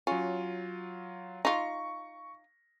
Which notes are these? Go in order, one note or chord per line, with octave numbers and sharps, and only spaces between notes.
F#3 C#4 F4
D#4 F4 C#6 A#6